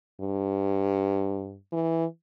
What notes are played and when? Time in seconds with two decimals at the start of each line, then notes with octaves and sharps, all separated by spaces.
0.21 G2
1.72 E3